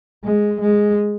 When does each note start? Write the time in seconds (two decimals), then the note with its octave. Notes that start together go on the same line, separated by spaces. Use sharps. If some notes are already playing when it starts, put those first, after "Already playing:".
0.24 G#3
0.61 G#3